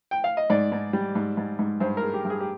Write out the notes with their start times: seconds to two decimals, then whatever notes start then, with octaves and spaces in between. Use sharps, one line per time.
0.11 G5
0.24 F5
0.37 D#5
0.50 G#2 D5
0.72 G#2
0.93 G3
1.15 G#2
1.37 G#2
1.59 G#2
1.80 G2 C5
1.97 A#4
2.03 G#3
2.14 G4
2.24 G2
2.30 G#4
2.41 G4